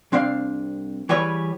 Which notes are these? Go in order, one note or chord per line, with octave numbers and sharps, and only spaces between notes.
C2 C4 D4 F5
E3 G3 G#4 B4 C#5